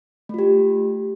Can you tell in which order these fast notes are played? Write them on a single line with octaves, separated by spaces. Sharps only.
A3 F4 G4